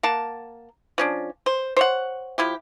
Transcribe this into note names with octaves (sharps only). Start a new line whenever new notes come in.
A#3 F#5 A5
F3 C#4 D4
C5
C5 C#5 F#5
F3 E4 G4